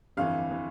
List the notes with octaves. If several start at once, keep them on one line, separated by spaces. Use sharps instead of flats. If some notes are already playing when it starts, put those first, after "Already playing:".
G1 F2 E3 F5
E3